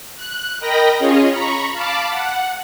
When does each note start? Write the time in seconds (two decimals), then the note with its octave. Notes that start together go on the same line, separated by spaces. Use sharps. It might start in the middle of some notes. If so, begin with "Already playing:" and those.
0.16 F#6
0.60 A#4 D#5 G5 B5 A#6
0.99 C#4 F4 G#4 C#5 D#5
1.31 A#5 B5 C#6
1.73 F5 A5 B5 D6
2.10 F#5